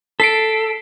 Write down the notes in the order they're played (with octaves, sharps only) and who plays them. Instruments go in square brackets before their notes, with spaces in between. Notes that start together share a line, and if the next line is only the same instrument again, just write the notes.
[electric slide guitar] A4 [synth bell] B6 C7 D7